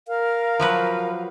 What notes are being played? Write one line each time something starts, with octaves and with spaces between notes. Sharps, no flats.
A#4 F5
F3 F#3 B4